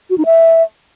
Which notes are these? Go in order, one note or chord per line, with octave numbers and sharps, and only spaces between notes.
F#4
D#4
E5